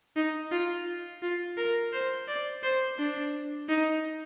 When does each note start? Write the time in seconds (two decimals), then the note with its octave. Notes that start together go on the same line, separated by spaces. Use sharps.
0.16 D#4
0.52 F4
1.22 F4
1.57 A#4
1.93 C5
2.28 D5
2.64 C5
2.99 D4
3.69 D#4